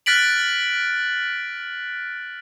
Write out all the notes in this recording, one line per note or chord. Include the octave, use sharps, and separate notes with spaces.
F6 F#6 A6 B6 D7 F#7